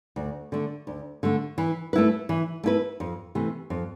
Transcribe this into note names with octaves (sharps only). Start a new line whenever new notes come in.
D2
D3 A3
D2
D3 A3
E3
A3 E4 B4
E3
A3 E4 B4
F2
C3 E3 A3
F2